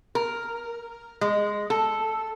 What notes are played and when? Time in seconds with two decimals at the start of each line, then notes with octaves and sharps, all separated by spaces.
0.15 A#4
1.21 G#3
1.70 A4